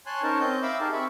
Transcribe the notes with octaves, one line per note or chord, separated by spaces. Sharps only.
C#5 G#5 A5 C6 F#6
C#4 D#4 A#4 C5 C#5 A5
C4 D#5 G6
E5 F5 B5 D6 E6
D#4 G4 G#4 A#4 A5
C4 E5 B5 C#6